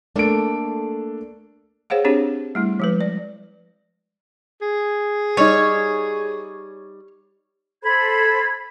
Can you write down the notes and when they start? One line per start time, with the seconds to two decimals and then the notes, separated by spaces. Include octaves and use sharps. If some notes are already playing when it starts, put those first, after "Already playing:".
0.16 A3 A#3 D4 A4 D7
1.90 G#4 C5 C#5 F5 F#5
2.05 C4 D4 G4 G#4 C#5
2.55 G3 A3 E4
2.80 F3 G#3 B4
3.01 D5
4.61 G#4
5.37 G3 D#4 C#5
7.82 A4 C5 B5 G#6